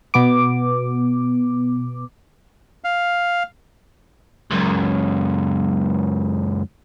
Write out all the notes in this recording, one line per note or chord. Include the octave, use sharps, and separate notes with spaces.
B2 B3 D6
F5
C#2 F#2